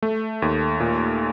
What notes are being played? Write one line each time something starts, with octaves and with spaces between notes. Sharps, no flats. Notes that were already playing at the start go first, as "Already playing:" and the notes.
A3
D#2
A#2